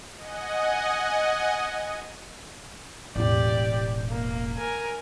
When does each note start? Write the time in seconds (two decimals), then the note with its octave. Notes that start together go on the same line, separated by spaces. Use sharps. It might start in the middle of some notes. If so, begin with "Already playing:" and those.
0.16 D#5 F#5 G#5
3.16 E1 A1 G4 D5
4.10 A#3
4.57 A#4 G#5